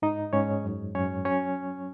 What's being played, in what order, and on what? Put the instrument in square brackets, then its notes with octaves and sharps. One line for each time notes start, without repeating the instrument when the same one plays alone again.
[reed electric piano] G#2 D#4 D#5
G#2 C#4 C#5
F#2
F#2 C#4 C#5
F#3 C#4 C#5